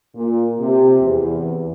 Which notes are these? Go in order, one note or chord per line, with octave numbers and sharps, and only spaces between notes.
A#2
C3
E2